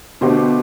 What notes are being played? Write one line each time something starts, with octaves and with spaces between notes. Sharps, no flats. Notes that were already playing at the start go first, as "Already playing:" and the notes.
B2 D3 A3 D4 G4 C5